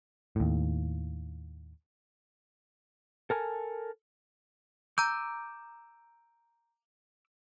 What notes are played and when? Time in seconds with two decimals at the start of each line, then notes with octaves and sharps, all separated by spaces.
0.36 D#2 A2
3.30 A4 A#4 G#5 A5
4.98 A#5 D6 E6 G6